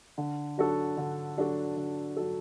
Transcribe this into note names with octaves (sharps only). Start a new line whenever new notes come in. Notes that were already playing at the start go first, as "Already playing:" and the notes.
D3
F#3 D4 F#4 A4
D3
F#3 D4 F#4 A4
D3
F#3 D4 F#4 A4